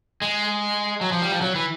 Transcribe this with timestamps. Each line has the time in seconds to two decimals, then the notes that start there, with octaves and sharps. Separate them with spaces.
0.22 G#3
1.01 F#3
1.12 F3
1.22 G3
1.32 F3
1.42 F#3
1.55 E3